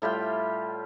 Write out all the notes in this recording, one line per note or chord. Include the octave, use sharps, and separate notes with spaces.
A2 G3 F4 G5